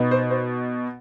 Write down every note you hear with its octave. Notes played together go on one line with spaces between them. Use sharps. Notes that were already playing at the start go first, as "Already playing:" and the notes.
Already playing: B2 B3 D#4
C5
C5